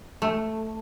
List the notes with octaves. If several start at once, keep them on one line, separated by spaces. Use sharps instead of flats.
A3